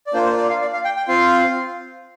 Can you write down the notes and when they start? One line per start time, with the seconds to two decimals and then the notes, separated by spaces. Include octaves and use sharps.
0.07 D5
0.13 A#3 D4 F4 C5
0.26 C5
0.37 D5
0.49 F5
0.61 D5
0.73 F5
0.85 G5
0.97 G5
1.08 C4 F4 F5